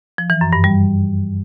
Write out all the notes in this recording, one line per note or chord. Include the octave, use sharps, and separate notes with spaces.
F3
E3
F#2
G2
G3